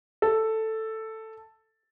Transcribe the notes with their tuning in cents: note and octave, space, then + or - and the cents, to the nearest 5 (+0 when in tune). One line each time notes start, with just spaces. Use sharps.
A4 +5